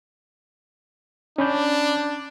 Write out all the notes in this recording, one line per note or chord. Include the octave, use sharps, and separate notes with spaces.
C#4 D4 B5 G6